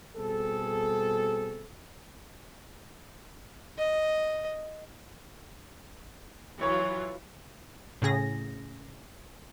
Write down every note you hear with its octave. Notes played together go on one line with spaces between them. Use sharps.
B2 G3 C4 G#4 A4
D#5
E3 F#3 F4 C#5 C#6
A2 C#3 G#4 A#6